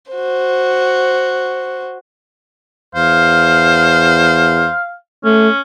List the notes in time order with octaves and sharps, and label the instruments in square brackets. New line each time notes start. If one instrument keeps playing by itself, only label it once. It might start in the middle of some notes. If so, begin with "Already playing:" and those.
[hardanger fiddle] F#4 C5
[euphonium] E2 [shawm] C5 [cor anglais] F5
[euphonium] A3 [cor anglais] C#4